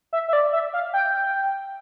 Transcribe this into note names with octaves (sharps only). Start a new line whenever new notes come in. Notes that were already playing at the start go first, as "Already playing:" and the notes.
E5
E5
D5
E5
F5
G5